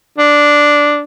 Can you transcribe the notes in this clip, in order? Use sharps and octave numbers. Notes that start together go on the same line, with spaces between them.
D4